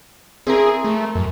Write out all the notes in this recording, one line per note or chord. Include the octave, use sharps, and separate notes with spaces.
C4 E4 G#4 A#4
A3
F#2